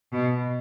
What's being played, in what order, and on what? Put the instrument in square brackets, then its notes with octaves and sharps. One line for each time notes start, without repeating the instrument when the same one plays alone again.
[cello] B2